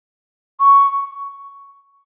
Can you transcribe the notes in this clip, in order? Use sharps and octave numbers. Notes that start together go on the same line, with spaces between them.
C#6